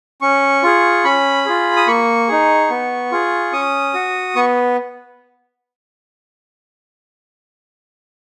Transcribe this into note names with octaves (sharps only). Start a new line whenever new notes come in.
C#4 C#6
F4 G#4
C#4 B5
F4 G#4
D#6
A#3 C#6
D#4 G#4
B3
F4 G#4
C#4 D#6
F#4
B3 C#6